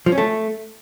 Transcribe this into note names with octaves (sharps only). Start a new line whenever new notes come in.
F3
C#4
A3